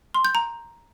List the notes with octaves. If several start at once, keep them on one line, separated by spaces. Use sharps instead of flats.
C6
G6
A#5